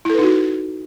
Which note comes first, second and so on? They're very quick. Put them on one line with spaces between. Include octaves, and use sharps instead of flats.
E4 A4 B4 D#4 F#4